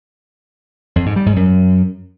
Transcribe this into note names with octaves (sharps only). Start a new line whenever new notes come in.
F2
G#2
G3
G#2
F#2